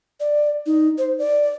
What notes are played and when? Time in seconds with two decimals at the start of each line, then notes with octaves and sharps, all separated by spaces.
0.20 D5
0.66 D#4
0.98 C5
1.19 D5